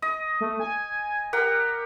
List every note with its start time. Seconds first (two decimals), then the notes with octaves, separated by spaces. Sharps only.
0.02 D#5
0.40 A3
0.60 G#5
1.33 G4 A#4 F#5